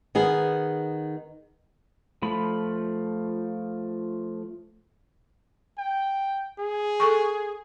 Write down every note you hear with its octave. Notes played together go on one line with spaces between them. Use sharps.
D#3 B3 G#4
F3 A3 B5
G5
G#4
A4 G#5 C#6